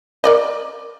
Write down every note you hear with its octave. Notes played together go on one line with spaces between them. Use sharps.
A#4 D5 D#5